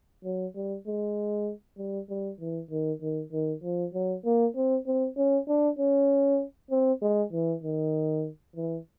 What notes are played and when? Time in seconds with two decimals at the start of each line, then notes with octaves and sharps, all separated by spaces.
0.25 F#3
0.55 G3
0.87 G#3
1.78 G3
2.09 G3
2.40 E3
2.71 D#3
3.02 D#3
3.32 D#3
3.63 F3
3.94 F#3
4.25 A#3
4.56 C4
4.87 C4
5.17 C#4
5.48 D4
5.79 C#4
6.71 C4
7.02 G#3
7.33 E3
7.63 D#3
8.56 E3